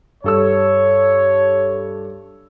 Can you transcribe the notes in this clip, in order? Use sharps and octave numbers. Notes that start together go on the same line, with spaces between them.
G2 A4 C#5 E6